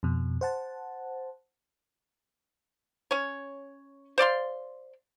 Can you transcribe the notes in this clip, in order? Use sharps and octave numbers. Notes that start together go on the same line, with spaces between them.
F2 B2
C5 F#5 A5
C#4 C#5
C5 D5 F5 C6